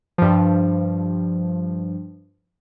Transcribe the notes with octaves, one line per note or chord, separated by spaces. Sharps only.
G2 F3